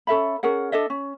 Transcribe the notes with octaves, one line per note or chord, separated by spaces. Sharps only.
C#4 A4 E5 B5
C#4 G#4 A#4 F#5
D4 A4 D#5 E5
C#4